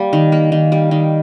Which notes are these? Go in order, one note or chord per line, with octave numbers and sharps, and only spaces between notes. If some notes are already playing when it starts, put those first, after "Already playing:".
Already playing: G3 A#3
D#3
A#3
D#3
G3
D#3